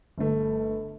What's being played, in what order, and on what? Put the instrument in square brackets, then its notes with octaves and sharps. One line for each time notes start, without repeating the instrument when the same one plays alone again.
[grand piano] G1 A3